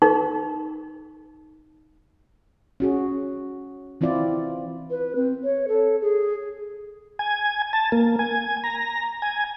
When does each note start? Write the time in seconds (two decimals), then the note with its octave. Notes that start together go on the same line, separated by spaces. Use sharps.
0.02 D#4
2.80 C#4 F#4 G#4
4.01 E3 C4 E4 F4 D5
4.90 B4
5.16 C4
5.44 C#5
5.68 A4
6.02 G#4
7.19 G#5
7.73 A5
7.92 A#3
8.19 G#5
8.64 A#5
9.22 G#5